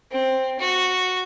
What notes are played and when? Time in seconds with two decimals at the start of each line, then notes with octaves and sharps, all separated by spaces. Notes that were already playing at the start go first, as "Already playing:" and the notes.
0.12 C4
0.59 F#4